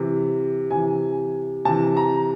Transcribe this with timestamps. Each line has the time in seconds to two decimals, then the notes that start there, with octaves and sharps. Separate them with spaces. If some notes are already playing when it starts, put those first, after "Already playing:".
Already playing: C3 E3
0.70 C3 E3 G#5
1.65 C3 E3 A5
1.97 A#5